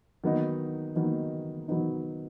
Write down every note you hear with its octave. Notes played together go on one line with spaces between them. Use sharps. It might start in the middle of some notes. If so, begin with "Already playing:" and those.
D#3 F#3 B3 D#4
D#3 F#3 B3 D#4
D#3 F#3 B3 D#4